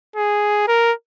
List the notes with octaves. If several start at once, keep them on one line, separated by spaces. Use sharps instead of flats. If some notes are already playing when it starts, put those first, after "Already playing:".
G#4
A#4